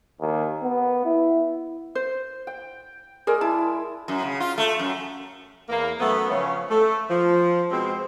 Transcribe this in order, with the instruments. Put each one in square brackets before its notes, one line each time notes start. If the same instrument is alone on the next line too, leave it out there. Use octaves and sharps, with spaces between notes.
[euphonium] D#2
B3
E4
[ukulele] C5
[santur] G5
[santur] G#3 D5 [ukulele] G#4 A#4
[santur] E4 [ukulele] A5
[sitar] F#2
C#3
F4
A3
F#2
[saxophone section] E2 A#3
F#2 A3 B3
C#3 F3 C#4
A3
F3
B2 G#3 C4